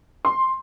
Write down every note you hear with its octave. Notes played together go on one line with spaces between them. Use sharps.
C6